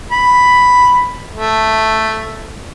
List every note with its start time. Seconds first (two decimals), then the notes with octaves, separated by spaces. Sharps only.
0.12 B5
1.35 A3